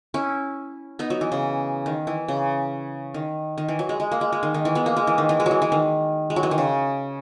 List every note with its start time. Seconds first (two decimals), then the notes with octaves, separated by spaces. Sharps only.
0.14 C#4 E4
0.99 B3 D#4
1.10 F#3
1.21 E3
1.32 C#3
1.86 D#3
2.07 E3
2.28 C#3
3.14 D#3
3.58 D#3
3.68 E3
3.79 F#3
3.89 G#3
4.00 G#3
4.11 A#3
4.21 G#3
4.33 G#3
4.43 D#3
4.54 D#3
4.65 E3
4.75 G#3 B3
4.86 A#3
4.96 G#3
5.07 E3
5.18 D#3
5.29 E3
5.40 G#3
5.46 F#3
5.51 E3
5.62 E3
5.72 D#3
6.30 G#3
6.36 F#3
6.43 E3
6.51 D#3
6.58 C#3